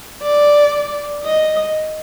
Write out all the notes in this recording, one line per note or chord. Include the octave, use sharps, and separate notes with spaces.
D5
D#5